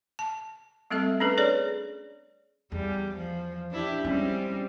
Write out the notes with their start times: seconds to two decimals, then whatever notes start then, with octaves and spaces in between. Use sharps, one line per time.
0.19 A5
0.90 G3 A3 C4 A4 E5
1.20 C#4 D4 A4 B4
1.38 G#4 B4 C#5 D5
2.72 E2 G3
3.15 F3
3.71 D4 E4 G4
4.05 G3 G#3 C4 C#4